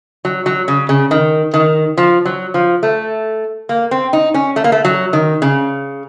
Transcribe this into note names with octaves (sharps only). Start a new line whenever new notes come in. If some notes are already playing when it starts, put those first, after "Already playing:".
F#3
F#3
C#3
C#3
D#3
D#3
F3
F#3
F3
A3
A#3
C4
D#4
C#4
A3
A#3
A3
F#3
D#3
C#3